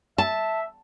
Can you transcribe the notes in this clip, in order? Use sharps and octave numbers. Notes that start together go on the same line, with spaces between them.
E5 A5